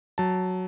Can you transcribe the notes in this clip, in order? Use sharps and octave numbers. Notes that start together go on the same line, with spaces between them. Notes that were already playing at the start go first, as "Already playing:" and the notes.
F#3 A5